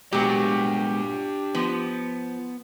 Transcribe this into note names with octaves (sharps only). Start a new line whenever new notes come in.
A#2 F#3 G#3 B3 D4 G4 G5
F3 B3